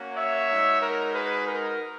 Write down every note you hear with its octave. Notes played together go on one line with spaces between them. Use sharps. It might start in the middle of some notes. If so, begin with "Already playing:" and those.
Already playing: A#3 C#4 F#4
C#5 E5
G#3 D#4 F#4
A#4
G#4 B4
A#4